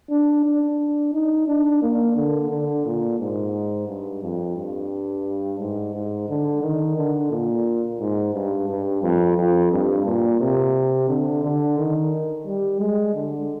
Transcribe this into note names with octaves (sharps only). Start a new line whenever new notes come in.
D4
D4
D#4
D4
A#3
D3
D3
A#2
G#2
G2
F2
G2
G#2
G#2
D3
D#3
D3
A#2
G#2
G2
G2
F2
F2
G2
A#2
C3
D3
D3
D#3
G3
G#3
D3